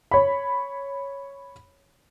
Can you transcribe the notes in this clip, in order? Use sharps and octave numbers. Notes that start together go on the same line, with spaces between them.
C#5 B5